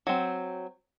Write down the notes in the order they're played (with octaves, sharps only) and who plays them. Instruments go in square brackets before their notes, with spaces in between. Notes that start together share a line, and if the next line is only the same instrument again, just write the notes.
[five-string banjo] F#3 C4